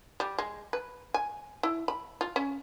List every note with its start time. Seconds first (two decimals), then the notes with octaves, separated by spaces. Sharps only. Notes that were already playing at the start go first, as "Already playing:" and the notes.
0.20 G3
0.38 G#3
0.73 B4
1.14 G#5
1.63 E4
1.88 B5
2.21 F4
2.36 C#4